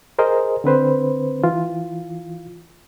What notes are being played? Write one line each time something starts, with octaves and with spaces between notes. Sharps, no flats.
G#4 A#4 C5 D#5
D3 C4 B4 C5
E3 F4